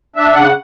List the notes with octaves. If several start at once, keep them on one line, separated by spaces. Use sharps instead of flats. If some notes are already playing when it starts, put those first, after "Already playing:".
D4 E5
C#3 F#5